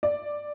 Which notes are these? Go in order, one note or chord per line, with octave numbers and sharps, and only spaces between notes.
D5